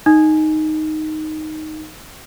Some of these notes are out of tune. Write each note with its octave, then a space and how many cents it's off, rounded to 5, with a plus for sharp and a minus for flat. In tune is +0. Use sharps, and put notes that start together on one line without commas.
D#4 +0